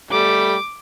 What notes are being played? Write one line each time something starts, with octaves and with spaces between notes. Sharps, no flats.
G3 A3 D6